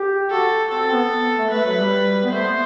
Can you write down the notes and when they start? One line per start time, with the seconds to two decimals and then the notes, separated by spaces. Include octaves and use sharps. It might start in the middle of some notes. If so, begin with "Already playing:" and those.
Already playing: G4
0.31 F#4 A4
0.71 C4 A4
0.91 B3
1.38 A3
1.51 A3 B4
1.64 F#3
1.78 G3
2.23 B3
2.31 A3 C5
2.45 B3